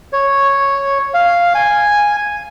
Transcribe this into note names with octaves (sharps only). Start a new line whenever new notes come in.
C#5
F5
G#5